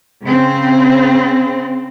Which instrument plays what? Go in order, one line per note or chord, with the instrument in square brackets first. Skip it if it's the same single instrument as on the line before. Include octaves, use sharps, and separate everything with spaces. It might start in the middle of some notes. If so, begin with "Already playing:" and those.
[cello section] C#3 C4